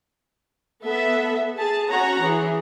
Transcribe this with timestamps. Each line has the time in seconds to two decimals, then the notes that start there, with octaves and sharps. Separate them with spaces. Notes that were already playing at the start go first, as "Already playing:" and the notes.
0.85 B3 A4 E5
1.56 G#4 A5
1.89 C#4 F#4 C#5 F#5 A#5
2.22 E3 G#4